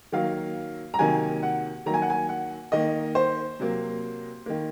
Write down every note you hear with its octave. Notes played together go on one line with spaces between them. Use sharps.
D#3 F#3 A#3 F5
A#5
C3 D#3 F#3 A#3 G#5
F#5
D#3 F#3 A#3 A#5
G#5
F#5
G#5
F#5
D#3 A#3 D#5
C5
C3 F#3 A#3
D#3 A#3